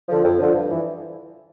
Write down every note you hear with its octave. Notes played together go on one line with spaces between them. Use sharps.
D3 F3
F2
D3 F3
G2
E3